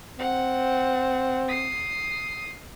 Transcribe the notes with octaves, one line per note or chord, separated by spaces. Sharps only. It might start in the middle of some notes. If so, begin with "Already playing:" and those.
C4 F#5
D#6 C7